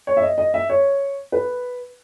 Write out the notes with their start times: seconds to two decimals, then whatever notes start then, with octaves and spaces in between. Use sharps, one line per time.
0.07 C#5
0.17 E5
0.22 D#5
0.38 D#5
0.54 E5
0.70 C#5
1.32 B4